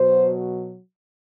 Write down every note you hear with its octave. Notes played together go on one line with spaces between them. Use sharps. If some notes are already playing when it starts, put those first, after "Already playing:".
Already playing: B2 F#3 C5